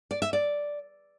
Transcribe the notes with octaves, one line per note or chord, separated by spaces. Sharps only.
D5
E5
D5